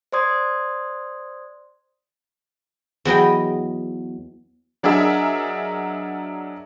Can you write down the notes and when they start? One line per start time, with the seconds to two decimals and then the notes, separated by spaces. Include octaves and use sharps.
0.12 C5 D5 C6 D#6 G#6
3.05 E2 F#3 D#5 G5
4.83 F#3 D4 G#4 A#4 D#5 E5